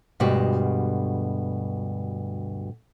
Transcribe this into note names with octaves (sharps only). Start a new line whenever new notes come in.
D2 G2 B2 G#3 F#4 G4